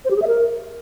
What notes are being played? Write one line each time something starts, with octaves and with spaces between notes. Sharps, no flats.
C5
G4
G#4
E5
A#4